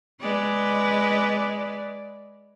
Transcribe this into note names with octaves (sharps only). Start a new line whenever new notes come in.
G#3 B4 D5